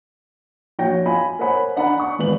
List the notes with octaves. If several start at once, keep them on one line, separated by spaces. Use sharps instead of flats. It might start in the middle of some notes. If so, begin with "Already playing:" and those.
A#1 F#4 C#5 G5 A#6
F4 G#5 B5
A#4 C5 C#5 F#5 G#5 B5
D4 F#5 G#5 A#5 B5
C#6
G#1 E2 B4 F#7